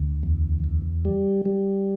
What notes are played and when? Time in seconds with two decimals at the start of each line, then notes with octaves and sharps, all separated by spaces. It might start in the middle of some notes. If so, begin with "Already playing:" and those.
Already playing: D2
0.23 E2
0.64 E2
1.05 G3
1.45 G3